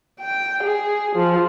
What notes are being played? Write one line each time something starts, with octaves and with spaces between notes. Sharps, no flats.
G5
G#4
F3